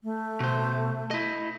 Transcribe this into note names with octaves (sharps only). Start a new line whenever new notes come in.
A3
B2 C5
E4 D#5